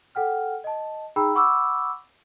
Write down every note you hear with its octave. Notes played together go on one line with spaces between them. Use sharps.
A4 F#5 G5 F6
D#5 A5
D#4 G#4 G5 A#5 B5 E6
F#5 B5 C#6 D6 E6